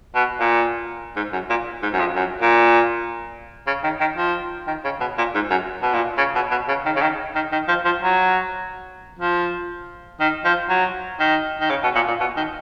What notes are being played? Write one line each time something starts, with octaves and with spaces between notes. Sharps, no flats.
B2
A#2
G#2
F#2
A#2
G#2
F#2
F2
F#2
A#2
C#3
D#3
D#3
F3
D#3
C#3
B2
A#2
G#2
F#2
B2
A#2
C#3
B2
B2
C#3
D#3
C#3
D#3
D#3
D#3
F3
F3
F#3
F3
D#3
F3
F#3
D#3
D#3
C#3
B2
A#2
A#2
B2
D#3